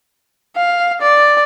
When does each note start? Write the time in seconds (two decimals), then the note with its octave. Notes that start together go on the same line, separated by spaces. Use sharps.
0.56 F5
1.01 D5